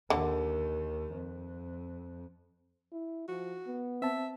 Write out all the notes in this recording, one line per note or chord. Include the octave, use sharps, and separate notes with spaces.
D#2 D3 D#3
F2
E4
F3 F#4
B3
C4 E5 A5